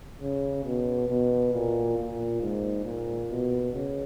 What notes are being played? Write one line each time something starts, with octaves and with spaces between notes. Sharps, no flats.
C#3
B2
B2
A#2
A#2
G#2
A#2
B2
C#3